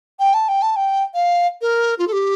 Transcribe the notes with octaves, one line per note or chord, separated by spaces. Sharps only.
G5
A5
G5
A5
G5
F5
A#4
F4
A4
G4